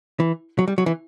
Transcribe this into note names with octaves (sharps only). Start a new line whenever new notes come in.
E3
F#3
G3
F#3
E3